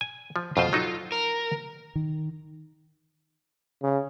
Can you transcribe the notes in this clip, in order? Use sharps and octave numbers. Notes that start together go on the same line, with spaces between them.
G#5
F3
F2 B2 F4 C5
F#3 D#4 A4
A#4
D#3
C#3